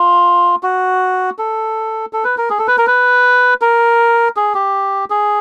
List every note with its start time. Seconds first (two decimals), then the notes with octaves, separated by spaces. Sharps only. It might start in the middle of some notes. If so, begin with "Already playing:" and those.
Already playing: F4
0.63 F#4
1.39 A4
2.13 A4
2.24 B4
2.38 A#4
2.50 G#4
2.59 A4
2.68 B4
2.78 A#4
2.87 B4
3.61 A#4
4.36 G#4
4.54 G4
5.10 G#4